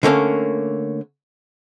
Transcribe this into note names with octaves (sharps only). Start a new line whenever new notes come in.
D3 A3 A#3 C#4